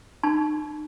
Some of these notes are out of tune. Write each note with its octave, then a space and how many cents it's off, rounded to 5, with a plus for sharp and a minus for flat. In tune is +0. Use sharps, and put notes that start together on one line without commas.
D#4 -40 A5 -35